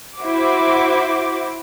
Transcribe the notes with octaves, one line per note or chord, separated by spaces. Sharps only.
E4 F#4 C5 D6